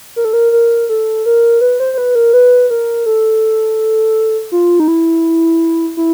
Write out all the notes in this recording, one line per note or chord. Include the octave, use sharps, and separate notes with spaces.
A#4
A4
A#4
A#4
A4
A#4
B4
C5
C5
B4
A#4
B4
A#4
A4
F4
D#4
E4
E4